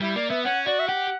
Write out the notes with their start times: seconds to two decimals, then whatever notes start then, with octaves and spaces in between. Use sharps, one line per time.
0.01 G3 E4
0.16 A#3 D5
0.30 B3 E5
0.45 C#4 F#5
0.66 F#4 D5
0.79 E5
0.88 G4 F#5